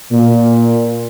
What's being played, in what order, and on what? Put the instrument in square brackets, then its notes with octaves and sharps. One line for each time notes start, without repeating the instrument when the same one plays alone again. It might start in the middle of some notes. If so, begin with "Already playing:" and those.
[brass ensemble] A#2